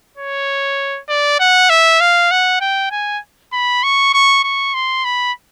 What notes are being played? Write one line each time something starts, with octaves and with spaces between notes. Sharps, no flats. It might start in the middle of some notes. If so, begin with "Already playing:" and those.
C#5
D5
F#5
E5
F5
F#5
G5
G#5
B5
C#6
C#6
C#6
C6
B5